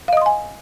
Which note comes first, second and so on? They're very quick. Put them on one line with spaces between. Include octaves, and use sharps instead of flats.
F5 D#5 D#6 C6 G#5